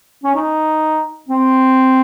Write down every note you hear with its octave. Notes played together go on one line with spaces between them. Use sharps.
C#4
D#4
C4